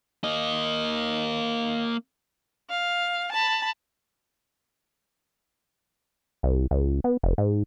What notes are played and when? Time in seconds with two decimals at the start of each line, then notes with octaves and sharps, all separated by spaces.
0.24 A#3 D#5
2.70 F5
3.32 A5 B5
6.43 C2
6.71 C#2
7.04 B3
7.23 F1
7.38 G#2